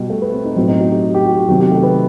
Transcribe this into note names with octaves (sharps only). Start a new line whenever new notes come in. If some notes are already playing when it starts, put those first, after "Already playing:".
Already playing: B2 G3
A3
B3
C4
D#4
A2 F#3 C4
D#4
F#4
G4
F#4
G4
F#4
F#4
C3 D#3 F#3 G4
G4
A3
B3